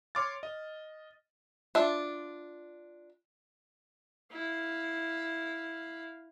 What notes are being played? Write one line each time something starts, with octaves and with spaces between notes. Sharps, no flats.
C#5 C6 D6 F6 A6
D#5
D4 F4 E5
E4 F5